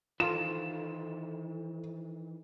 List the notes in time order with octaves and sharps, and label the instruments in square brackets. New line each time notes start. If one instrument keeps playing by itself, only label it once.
[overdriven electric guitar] D#3 E3 [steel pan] F4 [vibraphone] A4 C5 [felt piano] E7